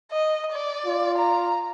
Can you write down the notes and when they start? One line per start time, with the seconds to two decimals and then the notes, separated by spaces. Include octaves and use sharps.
0.11 D#5
0.52 D5
0.86 F4
1.17 A#5